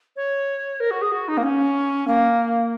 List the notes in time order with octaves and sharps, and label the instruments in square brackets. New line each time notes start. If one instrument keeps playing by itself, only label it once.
[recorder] C#5
A#4
F#4
G#4
F#4
D#4
A#3
C#4
A#3